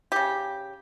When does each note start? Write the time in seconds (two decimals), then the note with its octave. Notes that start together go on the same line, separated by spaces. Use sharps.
0.12 C#3 G4